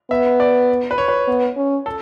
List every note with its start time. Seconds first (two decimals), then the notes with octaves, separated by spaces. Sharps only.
0.11 B3 E5
0.40 D5
0.91 B4
0.98 C#5
1.08 B4
1.28 B3
1.56 C#4
1.86 A4